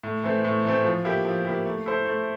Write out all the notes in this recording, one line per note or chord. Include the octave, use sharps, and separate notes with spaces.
A2
E3 A3 C4
A2
E3 A3 C4
F3
A#3 E4 G4
F3
A#3 E4 G4
A3
E4 A4 C5
A3